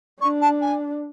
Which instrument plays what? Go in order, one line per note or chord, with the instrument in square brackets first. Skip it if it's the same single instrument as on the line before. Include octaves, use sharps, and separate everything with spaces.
[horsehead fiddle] D4 [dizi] C#6
[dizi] A5
G#5